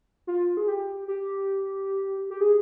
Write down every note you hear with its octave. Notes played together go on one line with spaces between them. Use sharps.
F4
G#4
G4
G4
G4
G#4